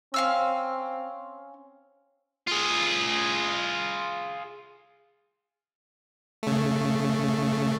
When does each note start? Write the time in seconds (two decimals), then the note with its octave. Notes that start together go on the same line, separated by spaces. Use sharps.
0.14 C4 C#4 F5 E6
2.48 F4 G#4
6.43 C#3 A3